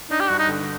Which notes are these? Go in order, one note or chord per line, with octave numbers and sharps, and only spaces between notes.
D4 D#4
G4
G2 F#4
D#4
D3